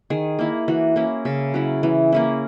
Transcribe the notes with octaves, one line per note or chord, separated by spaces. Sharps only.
D#3 G#4
A#3 E4
E3 F#4
A#3 C#4 E4
C#3 E5
F#3 C#4 E4
E3
A#3 C#4 E4